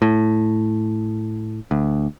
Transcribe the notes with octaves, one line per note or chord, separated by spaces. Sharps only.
A2
D2